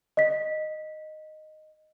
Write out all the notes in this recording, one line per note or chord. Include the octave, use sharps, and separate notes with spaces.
D#5 B6